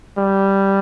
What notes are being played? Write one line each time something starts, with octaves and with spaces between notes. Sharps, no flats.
G3